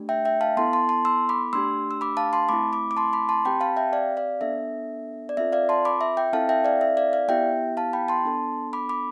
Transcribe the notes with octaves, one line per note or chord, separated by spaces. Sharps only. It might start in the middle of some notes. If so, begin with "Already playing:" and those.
Already playing: A3 D4 G4
E5 G5
E5 G5
F5 A5
B3 E4 A4 A5 C6
A5 C6
A5 C6
C6 E6
B5 D6
A3 D4 G4 C6 E6
E6
B5 D6
F5 A5
A5 C6
A3 C4 E4 B5 D6
B5 D6
D6
A5 C6
B5 D6
A5 C6
C4 G4 G5 B5
F5 A5
E5 G5
D5 F5
D5 F5
B3 D4 A4 E5
D5
C4 F4 A4 E5
D5 F5
A5 C6
B5 D6
E5
E5 G5
C4 E4 A4 F5 A5
E5 G5
D5 F5
E5
D5 F5
D5 F5
B3 E4 G4 E5 G5
F5 A5
G5 B5
A5 C6
B3 D4 A4
B5 D6
B5 D6